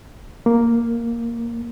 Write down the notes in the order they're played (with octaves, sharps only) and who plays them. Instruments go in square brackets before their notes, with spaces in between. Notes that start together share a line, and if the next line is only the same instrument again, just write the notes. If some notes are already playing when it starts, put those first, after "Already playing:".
[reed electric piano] A#3